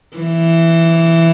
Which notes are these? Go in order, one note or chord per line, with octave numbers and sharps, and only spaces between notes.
E3